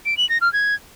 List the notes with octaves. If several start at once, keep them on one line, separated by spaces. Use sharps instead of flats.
D7
F#7
A#6
F6
G#6